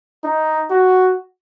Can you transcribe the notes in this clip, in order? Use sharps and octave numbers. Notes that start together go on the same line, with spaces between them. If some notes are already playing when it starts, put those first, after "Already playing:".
D#4
F#4